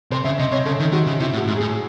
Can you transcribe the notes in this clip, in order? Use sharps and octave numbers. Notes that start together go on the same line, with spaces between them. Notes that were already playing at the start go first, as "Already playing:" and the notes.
C3 C5
C#3 E5
C3 D#5
C3 C#5
C#3 A4
D#3
D#3 F#4
C#3
C3 E4
A2
F#4
G#2
A2 G#4